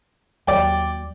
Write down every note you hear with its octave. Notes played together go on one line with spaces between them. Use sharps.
D#2 F#3 D5 G5